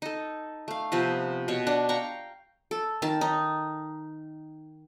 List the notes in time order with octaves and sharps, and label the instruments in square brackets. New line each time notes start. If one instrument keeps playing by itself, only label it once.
[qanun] D#4 A4
A3 F5
C3 F3 B3 C4
B2 C#5
D4 F#5
F5 G5 A#5 C#6
A4
D#3 A5
D#4